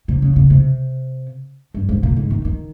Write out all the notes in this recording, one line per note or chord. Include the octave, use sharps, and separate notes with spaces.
C3
C#3
C#3
C3
G2
G#2
A#2
G#2
D#3
D#3